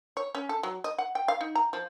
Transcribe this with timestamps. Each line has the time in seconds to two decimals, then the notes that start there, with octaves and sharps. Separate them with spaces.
0.17 C#5
0.35 C#4
0.49 A4
0.63 F#3
0.84 D#5
0.98 F#5
1.15 G5
1.28 F5
1.41 D#4
1.55 A#5
1.73 F3